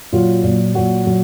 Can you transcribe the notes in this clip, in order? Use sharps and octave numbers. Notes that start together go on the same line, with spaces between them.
A#2 F#3 F4
A#2 F#3
A#2 F#3 F#4
A#2 F#3